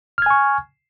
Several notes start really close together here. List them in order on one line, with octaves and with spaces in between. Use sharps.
F6 G#6 G#5 C#6